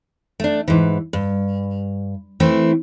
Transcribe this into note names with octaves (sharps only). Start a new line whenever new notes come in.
A3 D4
G#2 E3
G2
E3 A3 C4 E4